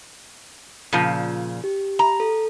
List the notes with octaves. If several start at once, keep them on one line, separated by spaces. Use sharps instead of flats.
A#2 C#3 F3
G4
A#5
A4